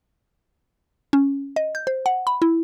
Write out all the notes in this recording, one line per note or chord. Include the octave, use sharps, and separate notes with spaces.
C#4
D#5
G6
C5
F#5
B5
E4